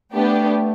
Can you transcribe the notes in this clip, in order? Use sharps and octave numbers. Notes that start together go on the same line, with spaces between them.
A3 B3 D4 G4